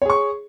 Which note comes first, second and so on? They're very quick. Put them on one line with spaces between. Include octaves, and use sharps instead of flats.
C#5 G#4 C#6